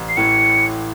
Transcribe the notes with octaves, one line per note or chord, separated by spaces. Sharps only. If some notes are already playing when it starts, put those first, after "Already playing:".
Already playing: A1
C7
A2 E3 C#7